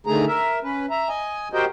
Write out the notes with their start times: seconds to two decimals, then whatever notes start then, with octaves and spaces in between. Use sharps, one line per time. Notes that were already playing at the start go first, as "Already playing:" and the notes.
0.07 D3 D#3 A3 G#4 A#5
0.28 A#4 E5
0.63 C#4 B4
0.90 E5 A#5
1.09 D#5 G#5
1.53 F#4 G4 A#4 C5 D#5 G5